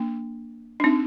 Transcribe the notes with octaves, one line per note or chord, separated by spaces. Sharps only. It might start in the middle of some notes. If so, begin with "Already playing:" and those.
Already playing: A#3 D4
D4
C4 D#4